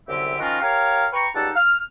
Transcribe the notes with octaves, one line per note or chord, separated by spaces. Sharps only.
C2 F#2 D3 G4 E5
D#3 F3 C#4 F4 F#4 A#4
G4 A#4 C#5 F5
B4 G5 A#5 C#6
C#2 G3 D#4 A4 F#5 A5
F6